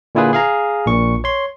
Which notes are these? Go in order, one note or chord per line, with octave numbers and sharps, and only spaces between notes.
A#2 D3 E4 F4 G#4 B4
G#4 F5 A#5
A#1 A#2 C#6
C#5 C6